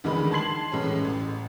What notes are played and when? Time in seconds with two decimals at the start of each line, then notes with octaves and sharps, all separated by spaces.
0.04 D2 D#3 E3 G#3 B5
0.31 A5 C6 G#6 C7 F#7
0.72 A2 E3 G#3 C#4
1.05 A1